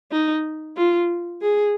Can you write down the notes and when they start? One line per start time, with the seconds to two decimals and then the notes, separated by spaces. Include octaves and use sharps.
0.12 D#4
0.77 F4
1.42 G#4